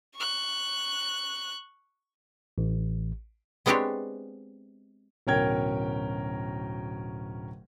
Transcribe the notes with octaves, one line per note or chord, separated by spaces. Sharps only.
C#6 F#6
A1
G#3 B3 C4 D4 G4 C#5
D1 B2 C#4 A#4 G5 G#6